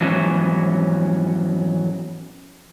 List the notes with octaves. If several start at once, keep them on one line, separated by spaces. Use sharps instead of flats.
F2 G#2 E3 F#3 B3 C#4